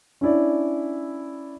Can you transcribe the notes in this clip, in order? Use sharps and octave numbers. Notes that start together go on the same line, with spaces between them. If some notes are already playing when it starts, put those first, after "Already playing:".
C#4 D4 E4 D5